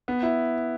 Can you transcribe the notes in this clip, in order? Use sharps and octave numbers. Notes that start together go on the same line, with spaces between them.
B3
E4